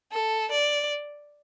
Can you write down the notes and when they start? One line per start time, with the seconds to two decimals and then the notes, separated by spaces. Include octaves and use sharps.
0.12 A4
0.51 D5